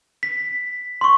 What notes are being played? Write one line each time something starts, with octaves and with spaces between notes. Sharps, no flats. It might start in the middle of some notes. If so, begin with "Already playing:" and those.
B6
C6 C#6